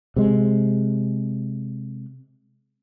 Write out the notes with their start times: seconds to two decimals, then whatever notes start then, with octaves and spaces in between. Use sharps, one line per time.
0.16 C3 G#3